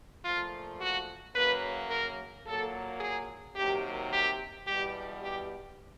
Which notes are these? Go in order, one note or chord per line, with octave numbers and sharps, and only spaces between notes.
A#2 F3 A3 F4
F#4
F#2 C#3 F#3 A#3 B4
A#4
A#2 F#3 A#3 A4
G#4
C3 D#3 F#3 A#3 G4
G4
E2 B2 G3 G4
G4